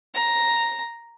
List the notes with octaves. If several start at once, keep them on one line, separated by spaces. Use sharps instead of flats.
A#5